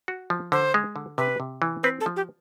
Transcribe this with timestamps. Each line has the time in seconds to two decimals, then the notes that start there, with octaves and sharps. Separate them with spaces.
0.08 F#4
0.30 F3
0.52 D3 C5
0.74 G#3
0.96 D3
1.18 C3 B4
1.40 C3
1.62 E3
1.83 C4 B4
2.00 A4
2.06 F3
2.16 G4